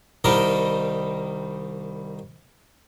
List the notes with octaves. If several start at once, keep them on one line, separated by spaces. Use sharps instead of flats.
C2 D#3 G3 A#4